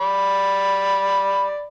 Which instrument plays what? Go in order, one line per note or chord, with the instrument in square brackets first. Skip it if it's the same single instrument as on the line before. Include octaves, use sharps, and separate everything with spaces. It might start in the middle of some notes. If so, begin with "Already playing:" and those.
[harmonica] D5 B5